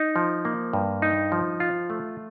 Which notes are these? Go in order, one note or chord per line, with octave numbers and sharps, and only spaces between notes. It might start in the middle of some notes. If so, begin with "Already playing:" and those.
Already playing: D#4
F3
A#3
G2
D#4
F3
F4
A3